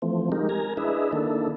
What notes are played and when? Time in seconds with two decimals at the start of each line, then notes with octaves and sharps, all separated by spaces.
0.02 E3 F3 A3 C4
0.32 G#3 D#4 G4 A#4
0.49 A#4 G#5 A#5
0.77 D4 E4 G#4 B4 D#5 E5
1.13 D#3 A#3 D4 E4 A4